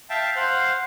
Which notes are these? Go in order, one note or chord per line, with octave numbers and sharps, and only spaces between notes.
E5 F5 G5 A5
C5 F5 F#5